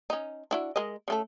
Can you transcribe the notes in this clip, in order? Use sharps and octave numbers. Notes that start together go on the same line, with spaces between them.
C#4 D#4
D4 E4 F#4
G#3 A#4 D#5
C#3 A3 A4